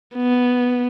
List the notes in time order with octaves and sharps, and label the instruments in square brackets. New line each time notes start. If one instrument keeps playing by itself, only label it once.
[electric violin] B3